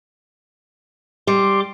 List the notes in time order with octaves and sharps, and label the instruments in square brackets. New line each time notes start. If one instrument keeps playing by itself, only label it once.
[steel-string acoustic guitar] G3 [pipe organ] C6 D6